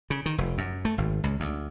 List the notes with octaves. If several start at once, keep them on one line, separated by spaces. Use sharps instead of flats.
C#3
D#3
F1
F#2
A3
G#1
C#2
D2